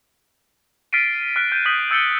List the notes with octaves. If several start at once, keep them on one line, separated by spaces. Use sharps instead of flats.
F6 A6 B6 C7 D7 D#7
F6 F#6 B6 D7
G6 D#7
D#6 G6 B6 D#7 F#7
E6 G6 A6 C#7 D#7 G7